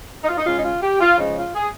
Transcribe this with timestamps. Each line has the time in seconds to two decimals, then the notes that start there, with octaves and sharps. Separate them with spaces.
0.24 D#4
0.28 F4
0.37 D#4
0.45 C#3 G#3 C#4 F4
0.57 D#4
0.64 F4
0.82 G4
1.01 F4
1.18 C#3 F3 G#3 C#4 D#4
1.37 F4
1.54 G#4